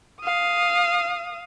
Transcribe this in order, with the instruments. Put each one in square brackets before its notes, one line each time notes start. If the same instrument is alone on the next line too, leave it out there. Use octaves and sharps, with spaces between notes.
[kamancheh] F5 D#6